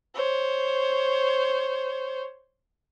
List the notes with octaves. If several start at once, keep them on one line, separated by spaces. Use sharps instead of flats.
C5 C#5